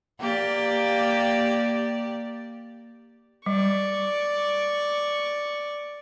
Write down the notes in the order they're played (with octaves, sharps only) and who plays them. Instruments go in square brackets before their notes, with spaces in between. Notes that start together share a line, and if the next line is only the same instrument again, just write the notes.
[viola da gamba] A#3 G4 D5
[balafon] G3 [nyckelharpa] D5 C#6